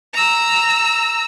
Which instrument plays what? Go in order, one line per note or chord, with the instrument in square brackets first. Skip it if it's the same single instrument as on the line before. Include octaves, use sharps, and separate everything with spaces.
[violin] A#5 E6